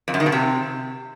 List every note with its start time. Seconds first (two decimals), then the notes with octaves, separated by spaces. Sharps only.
0.08 F2
0.14 F#2
0.20 D#3
0.26 B2
0.32 C3